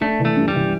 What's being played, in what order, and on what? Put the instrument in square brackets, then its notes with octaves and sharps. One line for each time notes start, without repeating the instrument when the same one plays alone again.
[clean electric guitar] A3 [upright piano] D4
[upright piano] E3
[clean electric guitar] A3
[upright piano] G2
[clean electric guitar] G3
[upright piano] E3